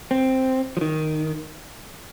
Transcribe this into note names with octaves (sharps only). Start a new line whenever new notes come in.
C4
F3
D#3